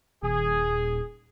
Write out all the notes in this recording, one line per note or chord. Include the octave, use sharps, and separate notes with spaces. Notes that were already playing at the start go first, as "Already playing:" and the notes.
D#1 G#4